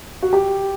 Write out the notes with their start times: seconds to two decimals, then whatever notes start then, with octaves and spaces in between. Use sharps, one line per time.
0.22 F#4
0.33 G4